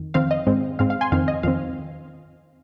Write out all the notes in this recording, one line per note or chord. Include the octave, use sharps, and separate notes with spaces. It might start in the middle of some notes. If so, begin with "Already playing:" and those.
Already playing: F2 D#3
F2 D#3 C4 F5
D#5
G#2 G#3 C4
G#2 G#3 C4 F5
F5
G#5 C6
F2 D#3 C4 F5
D#5
F2 D#3 C4 F5